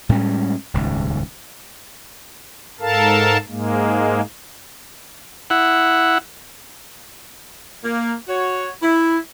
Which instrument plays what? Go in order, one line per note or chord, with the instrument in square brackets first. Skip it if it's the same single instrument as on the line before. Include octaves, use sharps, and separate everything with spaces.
[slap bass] A2 G3 G#3 C#4
D#1 C#2 G#2
[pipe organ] G#2 A4 A#4 F5 A5
G#2 G#3 A#3
[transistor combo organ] E4 F#5
[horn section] A#3
F#4 C#5
E4